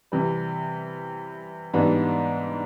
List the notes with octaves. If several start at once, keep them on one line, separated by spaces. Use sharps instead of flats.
C3 E3 G3
G#2 E3 G3 B3 D4